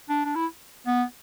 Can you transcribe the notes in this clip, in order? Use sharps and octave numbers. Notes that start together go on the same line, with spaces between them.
D4
D4
E4
B3